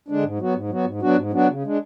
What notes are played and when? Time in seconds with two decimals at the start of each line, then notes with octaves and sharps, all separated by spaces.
0.08 D3 G#3 D4
0.23 G#2
0.39 F#3 B3 F#4
0.55 G#2
0.69 F#3 B3 F#4
0.85 G#2
1.01 F#3 B3 D4 F#4
1.16 G#2
1.31 F#3 B3 D4 F#4
1.48 C#3
1.63 G#3 D4